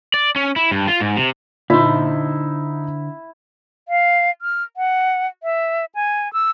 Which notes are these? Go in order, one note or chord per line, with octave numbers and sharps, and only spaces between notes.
D5
C#4
E4
G2
F4
G#2
C3
A#2 D3 D#4 E4 C5 B6
F5
F6
F#5
E5
G#5
E6